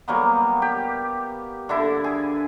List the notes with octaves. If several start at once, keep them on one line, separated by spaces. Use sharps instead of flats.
F#3 G3 A#3 B3
G4
D3 D4 E4
G#4